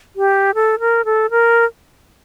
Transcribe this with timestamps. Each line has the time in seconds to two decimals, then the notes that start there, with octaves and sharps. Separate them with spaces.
0.16 G4
0.55 A4
0.80 A#4
1.05 A4
1.31 A#4